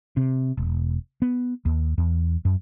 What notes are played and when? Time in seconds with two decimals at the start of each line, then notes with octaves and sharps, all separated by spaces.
0.17 C3
0.57 E1
1.22 B3
1.65 D#2
1.98 E2
2.45 F#2